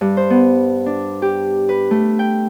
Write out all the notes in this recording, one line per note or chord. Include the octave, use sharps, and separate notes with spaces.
G2
C5
B3
D4
G4
B4
A3
G5